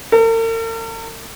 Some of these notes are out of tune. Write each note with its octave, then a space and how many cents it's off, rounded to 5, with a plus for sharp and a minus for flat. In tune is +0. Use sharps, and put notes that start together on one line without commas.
A#4 -45